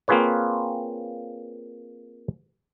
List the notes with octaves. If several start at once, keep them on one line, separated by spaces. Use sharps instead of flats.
A#3 C4 F4 G#4 B4 C#5